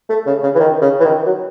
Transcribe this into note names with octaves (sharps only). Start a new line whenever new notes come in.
A3
C#3
C#3
E3
D#3
C#3
E3
D#3
F#3